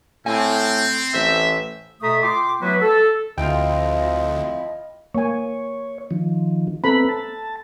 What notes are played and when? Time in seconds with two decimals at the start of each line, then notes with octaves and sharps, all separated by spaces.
0.26 A2 C4 G#5
1.14 A1 C5 E5
2.02 B2 A3 A4 E5 A#5 D#6
2.22 F4 G5 C6 D6
2.61 F#3 A3 B3 E4 F#4 B4
2.81 A4
3.38 D2 F3 C4 E4 F4 D#5 G5
5.15 A#3 C#5 G#5
6.11 D#3 F3
6.84 B3 C4 A4 A#5 B5
7.09 A5